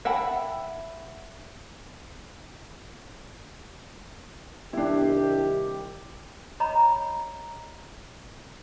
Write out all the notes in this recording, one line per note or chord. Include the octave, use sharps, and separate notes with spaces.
E5 F#5 G5 A5 B5
C2 D#3 D4 E4 G4
C#5 D#5 A#5 B5